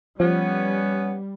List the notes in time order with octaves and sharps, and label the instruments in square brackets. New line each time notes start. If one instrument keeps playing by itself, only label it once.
[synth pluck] F3 [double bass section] G3 [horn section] B3 C#4